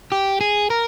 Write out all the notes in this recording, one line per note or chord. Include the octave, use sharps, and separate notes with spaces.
G4
G#4
A#4